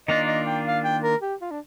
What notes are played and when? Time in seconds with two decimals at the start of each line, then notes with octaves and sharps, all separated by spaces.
0.08 D#3 A#3 D4 F4 D#5
0.27 D#5
0.45 G5
0.66 F5
0.84 G5
1.02 A#4
1.21 G4
1.41 F4
1.51 D4